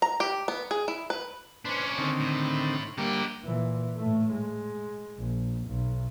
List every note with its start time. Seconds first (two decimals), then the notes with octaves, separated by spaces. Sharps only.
0.02 A#5
0.20 G4
0.48 B3
0.71 G#4
0.88 E4
1.10 B4
1.65 C#4 D4 B4 C5
1.98 D3 D#3 C4
2.20 A2
2.98 D3 G3 A#3 G4
3.43 A#2 E3
3.97 A2 A3
4.32 G#3
5.18 A#1
5.68 B1